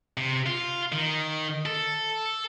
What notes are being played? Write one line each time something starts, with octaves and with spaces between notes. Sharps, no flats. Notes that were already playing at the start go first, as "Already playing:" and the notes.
C3
F4
D#3
A4